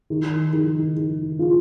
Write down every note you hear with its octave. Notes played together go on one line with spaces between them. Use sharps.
D#3
D#3
D#3
F4